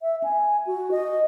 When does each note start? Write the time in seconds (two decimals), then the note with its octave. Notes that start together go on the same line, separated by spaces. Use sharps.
0.02 E5
0.24 G#5
0.67 F#4
0.91 D#5